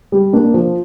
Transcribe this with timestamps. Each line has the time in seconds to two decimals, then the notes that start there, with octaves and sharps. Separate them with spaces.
0.12 G3
0.33 A#3 D4
0.54 F3